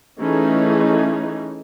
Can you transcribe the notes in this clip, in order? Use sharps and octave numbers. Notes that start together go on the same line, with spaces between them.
E3 A3 C#4 D#4 G#4